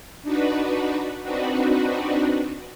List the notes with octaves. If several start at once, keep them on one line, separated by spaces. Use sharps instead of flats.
D4 D#4 F#4 B4
C4 D4 D#4 F#4 B4